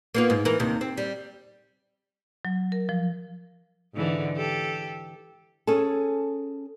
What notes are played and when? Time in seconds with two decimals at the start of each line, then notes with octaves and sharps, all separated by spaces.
0.14 A#3 B3 F4
0.30 G#2
0.45 E3 A#4
0.60 D#2 C3
0.81 C4
0.97 G3
2.45 F#3
2.72 A#4
2.89 F3
3.94 G#2 D3 E3
4.36 G4 A4
5.67 C#4 G#4 A4